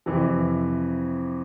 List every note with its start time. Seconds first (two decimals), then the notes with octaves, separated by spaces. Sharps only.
0.06 F2 C3 E3